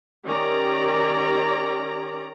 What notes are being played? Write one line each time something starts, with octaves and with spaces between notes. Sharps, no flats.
D#3 C#4 G4 D5 A#5